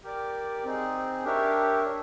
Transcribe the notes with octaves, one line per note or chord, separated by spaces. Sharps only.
G4 A#4 D5
C4 D#4 G#4
D4 G4 A#4 C#5 E5